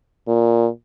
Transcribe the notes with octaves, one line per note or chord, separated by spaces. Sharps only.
A#2